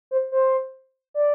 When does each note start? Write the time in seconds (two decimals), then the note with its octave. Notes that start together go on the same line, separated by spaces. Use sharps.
0.11 C5
0.32 C5
1.14 D5